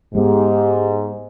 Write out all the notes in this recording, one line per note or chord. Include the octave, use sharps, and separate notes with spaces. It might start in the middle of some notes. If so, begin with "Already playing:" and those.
G#2 G#3 A3 B3 G4